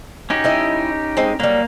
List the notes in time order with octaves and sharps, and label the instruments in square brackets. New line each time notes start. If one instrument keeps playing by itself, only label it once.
[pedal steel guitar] C#4 D#4 G4 [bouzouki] F#4
[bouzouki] G3 E4 D#5
G#3 C4 D#5
[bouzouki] F#3 G3 [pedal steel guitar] A#3